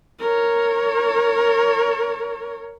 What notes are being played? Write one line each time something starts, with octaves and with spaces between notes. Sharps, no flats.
A#4 C#5